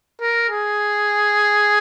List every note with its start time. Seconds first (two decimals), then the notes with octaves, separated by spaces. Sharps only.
0.21 A#4
0.50 G#4